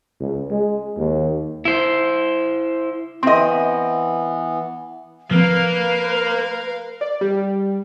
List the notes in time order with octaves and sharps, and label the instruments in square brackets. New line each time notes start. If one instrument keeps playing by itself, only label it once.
[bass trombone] C#2
G#3
D#2
[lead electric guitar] E4 C5
[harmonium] E3 B3 [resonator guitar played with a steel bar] C4 D#5 [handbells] E5 C6
[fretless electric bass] F3 C4 [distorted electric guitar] A#3 [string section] A#4 F5 [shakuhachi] B4
[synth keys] D5
G3